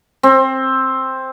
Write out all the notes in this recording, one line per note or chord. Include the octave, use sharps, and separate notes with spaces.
C4